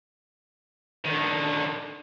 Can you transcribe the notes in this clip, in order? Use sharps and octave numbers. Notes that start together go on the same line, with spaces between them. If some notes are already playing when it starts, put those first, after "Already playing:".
D3 D#3